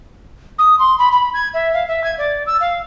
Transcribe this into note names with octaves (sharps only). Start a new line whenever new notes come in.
D#6
C6
B5
B5
G#6
E5
F5
E5
G#6
D5
E6
F5